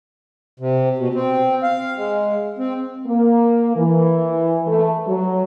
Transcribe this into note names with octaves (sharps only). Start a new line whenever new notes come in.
C3
B2
C4
F5
G#3
C4
A#3
E3
A3
F#3